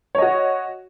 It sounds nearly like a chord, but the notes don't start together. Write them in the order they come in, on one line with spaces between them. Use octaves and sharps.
C#5 D#5 F#4